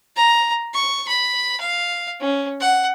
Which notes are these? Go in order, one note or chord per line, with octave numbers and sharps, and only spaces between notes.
A#5
C#6
B5
F5
C#4
F#5